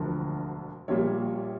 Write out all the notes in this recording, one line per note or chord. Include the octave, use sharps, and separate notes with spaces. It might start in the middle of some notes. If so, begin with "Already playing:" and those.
Already playing: E1 D2 D3 F3 A#4
A#1 A#2 G3 A#3 C#5